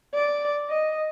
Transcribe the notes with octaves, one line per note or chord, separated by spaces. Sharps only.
D5
D#5